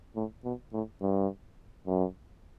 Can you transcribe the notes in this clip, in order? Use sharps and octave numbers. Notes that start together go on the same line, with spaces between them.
A2
B2
A2
G2
F#2